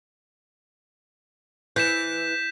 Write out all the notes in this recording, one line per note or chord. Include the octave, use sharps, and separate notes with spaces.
E3 G6 B6 E7